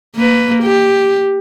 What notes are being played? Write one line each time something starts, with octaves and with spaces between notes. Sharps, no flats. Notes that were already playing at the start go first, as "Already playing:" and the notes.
A#3 B4
G4